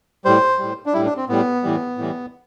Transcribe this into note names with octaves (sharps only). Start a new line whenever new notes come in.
A2 G3 C5
A2 G3
D4
A2 G3 E4
D4
C4
A2 G3 B3
A2 E3 G3
A2 E3 G3